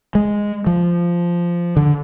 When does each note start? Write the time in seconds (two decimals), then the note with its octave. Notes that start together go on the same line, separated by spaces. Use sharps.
0.15 G#3
0.66 F3
1.77 D3